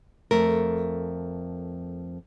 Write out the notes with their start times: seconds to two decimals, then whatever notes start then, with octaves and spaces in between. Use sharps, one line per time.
0.31 F2 A3 A#4